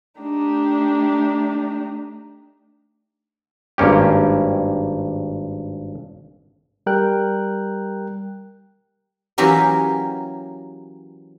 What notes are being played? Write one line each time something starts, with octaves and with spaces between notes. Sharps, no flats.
A3 D4 D#4 G4
G#1 G2 A#3 C#4 G4
G3 A#4 G5 F#6
E3 F#3 A#3 C#4 G4 A#4